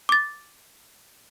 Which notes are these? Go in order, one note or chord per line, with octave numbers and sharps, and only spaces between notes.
D6 A6